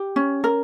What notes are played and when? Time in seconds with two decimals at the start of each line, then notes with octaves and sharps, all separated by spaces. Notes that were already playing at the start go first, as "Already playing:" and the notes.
Already playing: G4
0.16 C#4
0.44 A#4